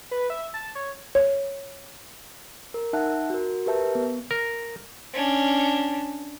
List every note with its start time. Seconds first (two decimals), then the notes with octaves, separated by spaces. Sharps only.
0.11 B4
0.30 E5
0.54 A5
0.75 C#5
1.15 C#5
2.74 A#4
2.93 D#4 E5 F#5 A5 F#6
3.30 F#4 A#4
3.66 G4 A#4 B4 E5 A5 G6
3.95 B3
4.31 A#4
5.13 C#4 D4